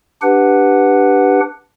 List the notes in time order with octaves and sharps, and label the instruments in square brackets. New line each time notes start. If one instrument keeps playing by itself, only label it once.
[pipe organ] D4 G4 B4 F#5